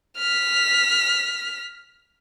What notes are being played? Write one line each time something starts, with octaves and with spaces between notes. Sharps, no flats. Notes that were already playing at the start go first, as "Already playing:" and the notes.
F6 B6